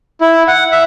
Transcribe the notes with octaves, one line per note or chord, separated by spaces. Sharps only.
E4
F#5
E5